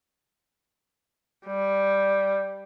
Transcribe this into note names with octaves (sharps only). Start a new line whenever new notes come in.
G3